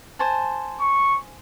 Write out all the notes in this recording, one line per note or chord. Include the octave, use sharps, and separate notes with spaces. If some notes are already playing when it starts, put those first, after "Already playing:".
C5 G#5 A5
C#6